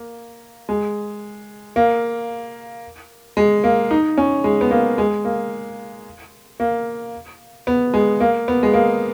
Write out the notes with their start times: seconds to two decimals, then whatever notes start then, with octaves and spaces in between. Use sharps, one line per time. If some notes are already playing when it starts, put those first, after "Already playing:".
Already playing: A#3
0.69 G#3
1.76 A#3
3.37 G#3
3.64 A#3
3.91 D#4
4.18 C#4
4.44 G#3
4.61 B3
4.71 A#3
4.98 G#3
5.25 A#3
6.60 A#3
7.67 B3
7.94 G#3
8.20 A#3
8.48 B3
8.63 G#3
8.74 A#3